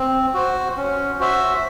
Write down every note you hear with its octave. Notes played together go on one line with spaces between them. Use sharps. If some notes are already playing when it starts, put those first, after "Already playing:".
Already playing: C4
F#4 C5
C#4
F#4 C5 E5